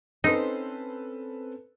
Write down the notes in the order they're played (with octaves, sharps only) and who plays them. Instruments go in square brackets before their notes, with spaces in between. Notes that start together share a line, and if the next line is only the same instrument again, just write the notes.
[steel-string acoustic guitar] C4 C#4 C5 [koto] D#4 [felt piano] A4 B4